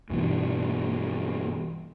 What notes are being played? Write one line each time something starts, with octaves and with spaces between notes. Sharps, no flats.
G2 B2 E3